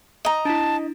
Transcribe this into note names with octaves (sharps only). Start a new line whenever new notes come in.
D#5 A#5
D4 E4 A5